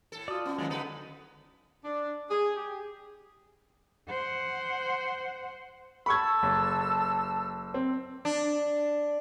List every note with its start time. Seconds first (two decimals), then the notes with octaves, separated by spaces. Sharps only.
0.12 A2 A4
0.28 F4 F#4 D5 D#6
0.46 B3 C#4
0.58 D#3 F#3 G#3 A#3 B3
0.70 D3 B3 D#4 F#4 B4
1.84 D4
2.30 G#4
2.55 G4
4.09 C5 F#5
6.06 A4 A5 B5 C#6 E6 G#6
6.43 F#1
7.74 C4
8.25 D4